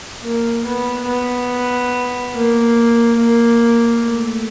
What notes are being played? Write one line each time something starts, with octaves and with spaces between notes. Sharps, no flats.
A#3
B3
B3
A#3
A#3
A3